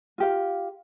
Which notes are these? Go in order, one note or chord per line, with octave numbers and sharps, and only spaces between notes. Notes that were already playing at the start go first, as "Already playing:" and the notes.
F4 G4 F5